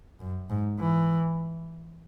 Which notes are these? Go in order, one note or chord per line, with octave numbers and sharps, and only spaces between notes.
F#2
G#2
E3